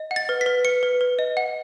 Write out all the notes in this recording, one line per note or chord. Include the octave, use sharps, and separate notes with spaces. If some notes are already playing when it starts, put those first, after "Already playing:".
Already playing: D#5
F#5
A6
B4
B6
B4
B4 C#7
B4
B4
D#5
F#5